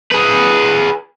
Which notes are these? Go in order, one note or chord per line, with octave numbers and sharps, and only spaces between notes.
G#4 B4